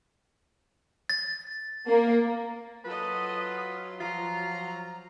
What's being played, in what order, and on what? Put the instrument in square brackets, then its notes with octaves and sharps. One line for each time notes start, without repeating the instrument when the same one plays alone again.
[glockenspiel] A6
[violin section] A#3
[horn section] F#3 F4 [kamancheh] A4 D#5 [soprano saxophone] B4
[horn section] F3 F#3 [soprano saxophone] F4 [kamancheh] A#5